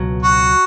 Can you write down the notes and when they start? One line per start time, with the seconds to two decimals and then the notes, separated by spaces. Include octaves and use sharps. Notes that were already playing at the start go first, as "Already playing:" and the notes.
Already playing: C#2 B2 F#3
0.23 F#4